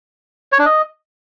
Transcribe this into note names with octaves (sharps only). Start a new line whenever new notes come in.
C#5
D4
D#5